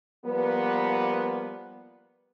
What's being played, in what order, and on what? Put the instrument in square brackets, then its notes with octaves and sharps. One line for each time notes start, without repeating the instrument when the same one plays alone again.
[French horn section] F3 G3 A#3 B3